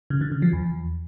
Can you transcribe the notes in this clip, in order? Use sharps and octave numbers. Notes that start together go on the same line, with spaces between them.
C#3
D3
C#3
F3
E2